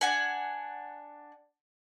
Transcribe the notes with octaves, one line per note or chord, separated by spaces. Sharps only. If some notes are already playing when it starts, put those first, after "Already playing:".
D4 F#5 G#5